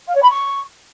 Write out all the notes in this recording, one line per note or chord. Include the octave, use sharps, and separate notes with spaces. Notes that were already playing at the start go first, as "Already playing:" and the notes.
F5
C#5
B5
C#6